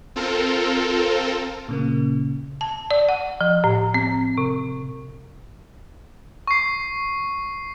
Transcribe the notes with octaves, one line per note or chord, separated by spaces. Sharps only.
C4 F4 A4 A#4
A#2 C#3 A#3
A5
D5
F#5
F3
A2
C4
C3
C#6 C7